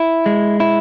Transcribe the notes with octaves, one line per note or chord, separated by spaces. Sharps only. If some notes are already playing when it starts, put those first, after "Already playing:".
Already playing: E4
G#3
E4